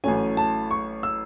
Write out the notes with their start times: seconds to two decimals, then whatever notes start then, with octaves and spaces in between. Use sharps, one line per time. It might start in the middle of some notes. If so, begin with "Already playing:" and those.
0.04 A1 A2 F#3 A3 C#4 G#5
0.37 A5
0.71 C#6
1.03 E6